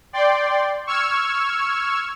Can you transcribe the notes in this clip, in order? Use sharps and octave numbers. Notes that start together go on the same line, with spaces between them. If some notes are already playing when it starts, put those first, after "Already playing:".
D5 G5 C6
C#6 E6 F6 G#6